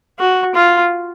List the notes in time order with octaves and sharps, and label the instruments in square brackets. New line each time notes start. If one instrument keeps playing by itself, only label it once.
[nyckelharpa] F#4
F4